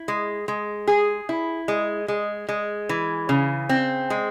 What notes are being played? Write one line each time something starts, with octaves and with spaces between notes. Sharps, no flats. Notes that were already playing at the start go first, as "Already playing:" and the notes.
Already playing: E4
G#3
G#3
G#4
E4
G#3
G#3
G#3
E3
C#3
C4
G#3